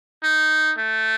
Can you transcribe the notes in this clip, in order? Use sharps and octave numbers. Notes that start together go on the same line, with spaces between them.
D#4
A3